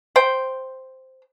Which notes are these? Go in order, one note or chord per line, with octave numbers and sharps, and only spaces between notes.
C5 G5